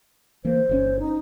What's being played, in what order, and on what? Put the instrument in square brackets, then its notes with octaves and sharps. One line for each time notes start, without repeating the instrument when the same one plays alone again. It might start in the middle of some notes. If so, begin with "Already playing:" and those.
[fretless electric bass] E3 A#3 [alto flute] C5
[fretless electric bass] G1 C#3 C#4
[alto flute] D#4